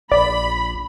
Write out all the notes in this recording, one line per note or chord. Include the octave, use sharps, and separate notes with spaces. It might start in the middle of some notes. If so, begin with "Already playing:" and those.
A#1 D5 B5